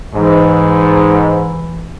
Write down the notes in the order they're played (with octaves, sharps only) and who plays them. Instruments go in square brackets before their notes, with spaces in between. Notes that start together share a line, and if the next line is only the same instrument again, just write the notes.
[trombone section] G#2 [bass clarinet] E3